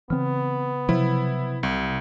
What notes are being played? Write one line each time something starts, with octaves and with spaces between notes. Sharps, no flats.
C#3 E3 B3 C4
C3 F3 F#3 E4
C2